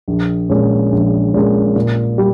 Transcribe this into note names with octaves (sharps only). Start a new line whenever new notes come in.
A#1
A#2 G#3 C#4
A#1
A#2 G#3 C#4
A#2
G3